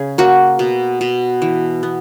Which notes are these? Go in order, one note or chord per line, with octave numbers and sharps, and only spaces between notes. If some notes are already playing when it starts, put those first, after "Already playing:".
Already playing: C#3 G#4
A#3 F#4
B2
B2
E3
B3